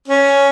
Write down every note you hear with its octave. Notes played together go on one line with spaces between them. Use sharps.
C#4